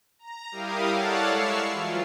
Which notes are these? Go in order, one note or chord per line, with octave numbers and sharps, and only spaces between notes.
A#5
G3 E4 G4 A#4 F5 D#6
A4 C#5 D5 F5 F#5 A5
G#3 E4 C#6 E6 F6 C7
E3 F#3 F4